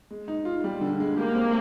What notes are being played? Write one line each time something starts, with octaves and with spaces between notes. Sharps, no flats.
G#3
D#4
F4
G3
D3
G#3
A#3 G4
C4